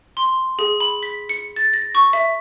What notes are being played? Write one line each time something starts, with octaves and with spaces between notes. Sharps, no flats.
C6
G#4
B5
B6
C#7
A6
A#6
C#6
E5